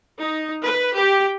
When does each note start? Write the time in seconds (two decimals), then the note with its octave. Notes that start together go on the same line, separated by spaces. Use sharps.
0.21 D#4
0.66 B4
0.98 G4